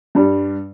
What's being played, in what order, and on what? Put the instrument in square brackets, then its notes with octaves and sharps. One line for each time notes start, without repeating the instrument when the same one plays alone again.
[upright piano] G2 G3